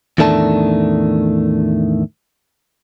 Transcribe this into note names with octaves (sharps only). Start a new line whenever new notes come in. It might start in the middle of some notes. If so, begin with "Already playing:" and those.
E2 A2 D#3 A3 D4 A5